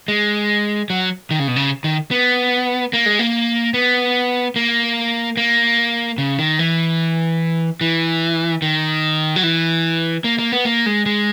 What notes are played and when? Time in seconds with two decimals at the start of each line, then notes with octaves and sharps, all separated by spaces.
0.08 G#3
0.90 F#3
1.31 D#3
1.39 C#3
1.48 B2
1.56 C#3
1.84 D#3
2.11 B3
2.93 A#3
3.06 G#3
3.19 A#3
3.74 B3
4.56 A#3
5.37 A#3
6.18 C#3
6.39 D#3
6.59 E3
7.81 E3
8.62 D#3
9.36 F#3
9.43 E3
10.24 A#3
10.39 A#3
10.52 B3
10.66 A#3
10.86 G#3
11.06 G#3